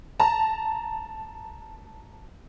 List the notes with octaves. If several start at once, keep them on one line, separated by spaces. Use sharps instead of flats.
A5 A#5